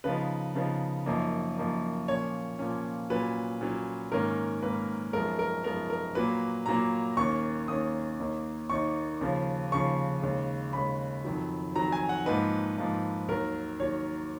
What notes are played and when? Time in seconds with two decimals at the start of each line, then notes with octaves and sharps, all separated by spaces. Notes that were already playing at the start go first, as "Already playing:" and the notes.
0.04 C#3 F3 B3 D#4 B4
0.55 C#3 F3 B3 D#4
1.06 F#2 F3 A#3 D#4
1.57 F#2 F3 A#3 D#4
2.08 A#2 F3 A#3 C#4 C#5
2.59 A#2 F3 A#3 C#4
3.10 A#2 F#3 C#4 B4
3.61 A#2 F#3 C#4
4.12 G#2 D#3 A#3 C#4 A#4
4.62 G#2 D#3 A#3 C#4 B4
5.13 F#2 F3 G#3 B3 D#4 A#4
5.39 A#4
5.64 F#2 F3 G#3 B3 D#4 A#4
5.90 A#4
6.15 A#2 F#3 A#3 B4
6.66 A#2 F#3 A#3 A#5
7.17 D#2 D#3 A#3 C#4 C#6
7.68 D#2 D#3 A#3 C#4 D#6
8.20 D#2 D#3 A#3 D#4
8.70 D#2 D#3 A#3 D#4 C#6
9.21 D#2 C#3 F3
9.72 D#2 C#3 F3 C#6
10.22 D#2 C#3 G#3
10.73 D#2 C#3 G#3 B5
11.25 F2 D#3 F#3
11.76 F2 D#3 F#3 A#5
11.92 G#5
12.09 F#5
12.26 G#2 F3 A#3 D#4 B4
12.77 G#2 F3 A#3 D#4
13.28 D#2 D#3 F#3 A#4
13.80 D#2 D#3 F#3 C#5